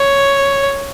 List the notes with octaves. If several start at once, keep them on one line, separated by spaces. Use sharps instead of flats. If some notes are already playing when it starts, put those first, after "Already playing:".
Already playing: C#5